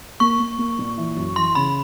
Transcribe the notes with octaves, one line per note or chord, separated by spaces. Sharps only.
A#3 C#6
A#3
A#3
A#2
E3
F#2
E3 C6
C#3 B5